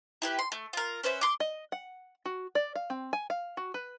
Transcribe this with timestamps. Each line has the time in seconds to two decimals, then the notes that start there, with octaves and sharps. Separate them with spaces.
0.22 E4 G4 B4
0.39 C6
0.52 A3
0.73 F4 A#4
1.03 C#4 B4 C5 E5
1.21 C6 D6
1.40 D#5
1.72 F#5
2.26 F#4
2.55 D5
2.76 F5
2.90 C4
3.13 G#5
3.30 F5
3.57 F#4
3.74 B4